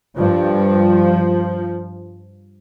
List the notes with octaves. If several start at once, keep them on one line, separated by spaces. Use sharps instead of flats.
G2 F3